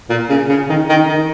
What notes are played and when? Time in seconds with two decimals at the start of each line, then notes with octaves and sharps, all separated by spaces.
0.09 A#2
0.29 C#3
0.49 C#3
0.69 D#3
0.89 D#3
1.08 D#3